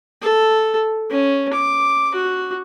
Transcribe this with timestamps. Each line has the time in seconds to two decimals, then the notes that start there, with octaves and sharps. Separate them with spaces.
0.22 A4
1.10 C#4
1.53 D6
2.15 F#4